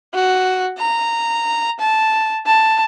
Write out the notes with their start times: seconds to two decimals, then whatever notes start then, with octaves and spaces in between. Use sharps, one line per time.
0.14 F#4
0.78 A#5
1.80 A5
2.46 A5